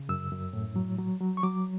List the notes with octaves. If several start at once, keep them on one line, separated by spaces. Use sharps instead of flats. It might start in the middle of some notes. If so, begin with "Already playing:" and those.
Already playing: C#3
F#2 E6
F#2
A2
F#3
F#3
F#3
C#6
F#3 D6